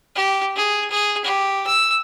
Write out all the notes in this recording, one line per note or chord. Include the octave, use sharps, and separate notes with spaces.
G4
G#4
G#4
G4
E6